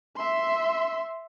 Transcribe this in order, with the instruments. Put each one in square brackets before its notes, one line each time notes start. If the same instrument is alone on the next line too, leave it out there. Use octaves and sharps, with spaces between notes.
[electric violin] E5 C6